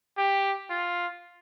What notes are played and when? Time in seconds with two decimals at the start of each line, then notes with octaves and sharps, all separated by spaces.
0.18 G4
0.70 F4